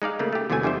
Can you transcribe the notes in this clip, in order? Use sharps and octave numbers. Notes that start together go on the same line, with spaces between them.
G#3 D#4 D5 F5
C#3 A3 A#3
A3 G4
D#2 C3 E3 F#3 A3 G#5
E2 D3 G3 E4 C5